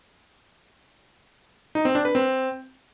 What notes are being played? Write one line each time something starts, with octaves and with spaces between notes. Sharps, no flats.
D#4
C4
D4
B4
C4